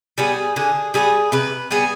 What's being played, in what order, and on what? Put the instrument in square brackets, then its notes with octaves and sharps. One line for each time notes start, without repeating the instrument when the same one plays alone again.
[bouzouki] G3 B3 G#4
D3 G#4
G3 B3 G#4
C3 B4
G3 B3 G#4